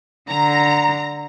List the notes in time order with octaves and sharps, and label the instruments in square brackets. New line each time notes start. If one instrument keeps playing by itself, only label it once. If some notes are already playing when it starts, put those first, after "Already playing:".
[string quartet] D3 [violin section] A#5